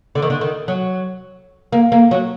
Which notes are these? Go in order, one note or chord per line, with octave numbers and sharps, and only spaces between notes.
D3
D#3
D3
D#3
F#3
A#3
A#3
F#3